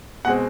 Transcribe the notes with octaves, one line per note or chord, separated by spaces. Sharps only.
B2 G#3 C4 F#5